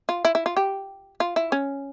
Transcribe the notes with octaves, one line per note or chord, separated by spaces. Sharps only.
F4
E4
E4
F4
G4
F4
E4
C#4